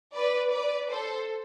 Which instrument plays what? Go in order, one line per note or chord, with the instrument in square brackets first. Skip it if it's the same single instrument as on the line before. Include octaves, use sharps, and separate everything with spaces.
[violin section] B4 D5
B4 D5
A4 C5